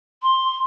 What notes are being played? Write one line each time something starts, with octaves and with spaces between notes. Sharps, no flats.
C6